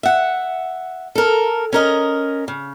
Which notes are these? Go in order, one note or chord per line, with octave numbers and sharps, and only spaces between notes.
E5 F#5
A4 A#4
C#4 A#4 D#5
C#3